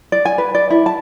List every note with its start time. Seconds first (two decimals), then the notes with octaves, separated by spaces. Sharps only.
0.12 D5
0.25 G#5
0.38 B4
0.55 D5
0.70 E4
0.86 A5